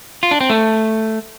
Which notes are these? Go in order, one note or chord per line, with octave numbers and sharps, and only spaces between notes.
F4
D4
C4
A3